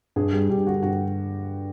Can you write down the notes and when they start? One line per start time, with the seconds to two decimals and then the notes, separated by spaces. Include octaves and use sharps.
0.16 G2 G#4
0.33 G3 G#4
0.49 G2 G4
0.67 D3 F#4
0.83 G2 F#4